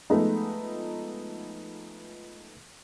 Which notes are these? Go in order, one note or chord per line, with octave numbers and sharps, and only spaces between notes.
F3 G#3 A3 B3 D#4